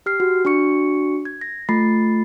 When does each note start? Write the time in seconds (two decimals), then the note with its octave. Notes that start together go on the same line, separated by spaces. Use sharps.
0.06 G4 F6 C7
0.20 F#4
0.45 D4 F#4 C#6 C#7
1.25 G#6
1.41 A#6
1.69 A3 F4 B5 A6 C7